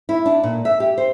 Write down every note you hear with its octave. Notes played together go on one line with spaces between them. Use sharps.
E4
D4
A#2
E5
G4
C5